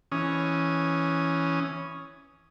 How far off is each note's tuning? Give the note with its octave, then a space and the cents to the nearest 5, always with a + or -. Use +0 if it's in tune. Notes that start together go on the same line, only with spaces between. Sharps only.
E3 +0 C#4 +0 D#6 +0